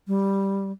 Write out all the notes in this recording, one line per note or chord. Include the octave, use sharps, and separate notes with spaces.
G3